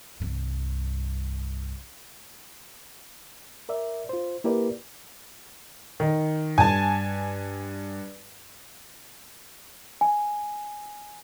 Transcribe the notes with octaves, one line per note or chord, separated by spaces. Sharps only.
C2 G2
A#4 D5 E5
F4 C5
A#3 E4 G4 A#4 B4 D5
D#3
G2 G#5 A5
G#5